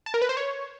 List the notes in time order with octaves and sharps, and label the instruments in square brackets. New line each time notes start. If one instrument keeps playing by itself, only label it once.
[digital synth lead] A5
A#4
B4
C5
C#5